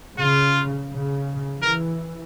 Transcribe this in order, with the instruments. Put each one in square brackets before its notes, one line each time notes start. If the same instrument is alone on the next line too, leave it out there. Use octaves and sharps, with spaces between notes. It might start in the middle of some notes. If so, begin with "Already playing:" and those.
[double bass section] C#3 [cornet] F4
[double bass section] C#3
[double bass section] E3 [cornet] A#4